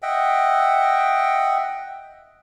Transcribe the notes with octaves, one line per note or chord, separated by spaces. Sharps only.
D#5 E5 F#5 G5